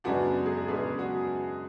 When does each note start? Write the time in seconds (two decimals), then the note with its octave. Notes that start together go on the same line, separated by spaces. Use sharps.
0.04 F#2 C#3 G#3 B3 D4 F#4
0.46 G#4
0.67 F#2 C#3 G#3 B3 D4 G#4
0.99 F#4